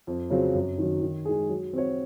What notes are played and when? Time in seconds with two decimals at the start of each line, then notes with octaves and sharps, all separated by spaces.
0.07 F2
0.30 C#3 F#3 C4 F4
0.55 F#2
0.78 D#3 F#3
1.02 D#3
1.25 G#3 D#4 G#4
1.49 F#3
1.73 C4 F#4 C#5